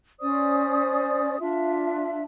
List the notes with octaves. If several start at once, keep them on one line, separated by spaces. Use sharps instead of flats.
C#4 C5 D5 D#6
D4 F4 E5